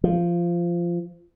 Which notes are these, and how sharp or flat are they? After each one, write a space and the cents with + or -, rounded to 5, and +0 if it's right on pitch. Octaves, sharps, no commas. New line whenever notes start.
F3 -15